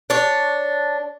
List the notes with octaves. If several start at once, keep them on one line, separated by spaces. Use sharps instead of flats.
D4 C#5